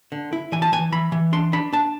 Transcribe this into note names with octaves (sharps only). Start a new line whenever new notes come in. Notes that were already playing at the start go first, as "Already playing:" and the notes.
D3
E4
E3 G#5
A5
E3 G#5
E3 B5
E3
D4 C6
D4 B5
D4 A5